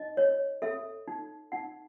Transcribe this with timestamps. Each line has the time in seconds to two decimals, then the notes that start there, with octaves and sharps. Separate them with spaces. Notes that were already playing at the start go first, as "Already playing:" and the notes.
Already playing: D#4 D#5
0.17 C#5
0.62 A4 E5
1.08 D#4
1.52 D#4 F#5